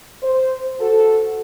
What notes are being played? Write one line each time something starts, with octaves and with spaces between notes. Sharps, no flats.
C5
F#4 A4